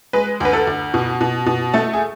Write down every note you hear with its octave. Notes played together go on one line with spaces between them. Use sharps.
G#3 B4
D2 B4
A4
D2
B2
B2
B2
A3 A4
G#4